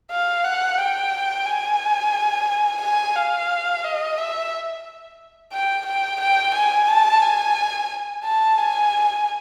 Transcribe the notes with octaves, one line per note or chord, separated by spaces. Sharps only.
F5
F#5
G5
G#5
G#5
F5
D#5
E5
G5
G5
G5
G#5
A5
G#5
A5
G#5